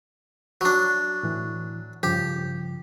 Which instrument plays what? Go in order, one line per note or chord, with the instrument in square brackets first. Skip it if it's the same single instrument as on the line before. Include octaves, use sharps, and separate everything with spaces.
[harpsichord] F#3 D4
[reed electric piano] A2 E3
[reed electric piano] G2 C#3 F3 [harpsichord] G4